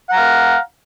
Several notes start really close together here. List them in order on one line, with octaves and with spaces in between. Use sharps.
F#5 A#5 F5